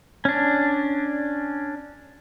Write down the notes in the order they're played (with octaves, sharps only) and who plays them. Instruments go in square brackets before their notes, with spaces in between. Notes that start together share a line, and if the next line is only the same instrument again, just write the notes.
[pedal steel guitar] C#4 D4